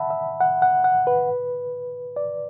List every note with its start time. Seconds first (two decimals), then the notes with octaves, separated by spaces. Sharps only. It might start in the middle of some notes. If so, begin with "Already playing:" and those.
Already playing: E5 F#5 A5 B5
0.10 E5
0.41 F#5
0.62 F#5
0.84 F#5
1.07 B4
2.16 D5